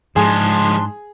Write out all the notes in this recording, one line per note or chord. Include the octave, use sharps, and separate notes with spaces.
G#2 F3 G#3 D4 G#4 C6